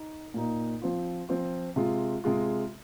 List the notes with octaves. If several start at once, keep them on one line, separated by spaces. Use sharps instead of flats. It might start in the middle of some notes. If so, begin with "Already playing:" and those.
Already playing: D#4
A#2 A#3 D#4
F3 C4 F4
F3 C4 F4
C3 G#3 F4
C3 G#3 F4